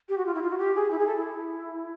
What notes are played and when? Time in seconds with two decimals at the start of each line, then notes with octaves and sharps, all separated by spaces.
0.09 G4
0.18 F#4
0.26 F4
0.34 E4
0.42 F4
0.50 F#4
0.58 G4
0.75 G#4
0.91 E4
0.99 G#4
1.07 A4
1.16 E4